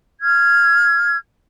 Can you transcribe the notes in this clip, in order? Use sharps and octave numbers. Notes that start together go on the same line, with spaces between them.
F6 G#6